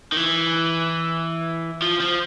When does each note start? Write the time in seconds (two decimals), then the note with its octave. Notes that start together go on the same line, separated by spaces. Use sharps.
0.12 D#3
0.17 E3
1.82 F3
2.00 F3